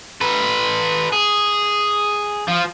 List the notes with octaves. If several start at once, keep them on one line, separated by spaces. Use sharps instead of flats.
A4 B4
G#4
F3